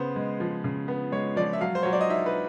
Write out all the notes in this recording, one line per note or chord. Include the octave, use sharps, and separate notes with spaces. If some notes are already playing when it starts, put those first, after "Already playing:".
Already playing: C#3 B3 C5
G#3
F3
C#3
B3
G#3 C#5
F3 D5
E5
F#3 F5
C5
F#3 C#5
D5
D#5
D#4 E5
B4